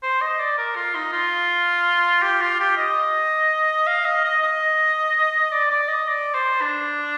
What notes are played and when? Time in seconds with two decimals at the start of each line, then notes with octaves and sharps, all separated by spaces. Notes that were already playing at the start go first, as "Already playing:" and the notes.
0.03 C5
0.22 D#5
0.39 D5
0.58 A#4
0.76 F4
0.95 D#4
1.13 F4
2.22 G4
2.41 F4
2.60 G4
2.77 D#5
3.87 F5
4.05 D#5
4.24 D#5
4.42 D#5
5.51 D5
5.70 D5
5.88 D#5
6.07 D5
6.34 C5
6.62 D4